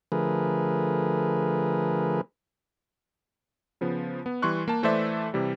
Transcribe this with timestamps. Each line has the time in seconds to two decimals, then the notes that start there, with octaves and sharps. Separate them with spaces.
0.12 D3 F3 A3 G#4 A#4 B4
3.81 C#3 F3 B3
4.26 B3
4.42 E3 G3 C6 C#6 F#6
4.68 A#3 A5
4.83 E3 A3 A4 C5 D5 E5
5.34 C3 E3 G3